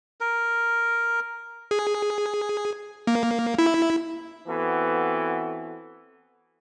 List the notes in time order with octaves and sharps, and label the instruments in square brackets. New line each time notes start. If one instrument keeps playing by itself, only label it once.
[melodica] A#4
[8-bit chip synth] G#4
A#3
E4
[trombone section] E3 B3 C4 F#4 A4